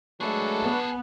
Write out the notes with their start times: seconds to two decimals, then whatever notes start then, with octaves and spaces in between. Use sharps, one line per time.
0.21 F#3 G#3 A3 D4 G#4 A4 B4 C#6
0.63 B3